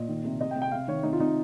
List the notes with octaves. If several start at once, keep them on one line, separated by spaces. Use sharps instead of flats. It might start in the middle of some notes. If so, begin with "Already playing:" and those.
Already playing: A#2 D#5
D#3
C3
C3 D#5
G5
C3
G5
C3 F5
D#3 C#5
C3 D#4
F4
C3 D#4